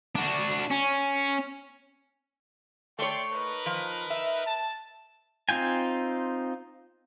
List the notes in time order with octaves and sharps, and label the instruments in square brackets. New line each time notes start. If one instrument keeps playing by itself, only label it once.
[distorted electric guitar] D4 F#4
C#4
[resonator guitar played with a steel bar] A3 C#5 [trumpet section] D5 G5 C6
[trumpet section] D#4 A#4 B4
[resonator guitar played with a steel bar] F3
E5
[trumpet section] A5
[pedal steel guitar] C4 D#4 F4 G5 G#5